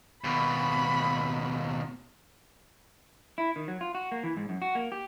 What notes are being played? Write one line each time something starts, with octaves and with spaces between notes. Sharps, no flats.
D#2 B2 B5
E4
D#3
F#3
F4
F#4
A#3
E3
G#2
F#2
F#4
A#3
G4